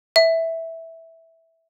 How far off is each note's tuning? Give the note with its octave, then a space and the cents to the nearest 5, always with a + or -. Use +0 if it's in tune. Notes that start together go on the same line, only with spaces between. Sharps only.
E5 -10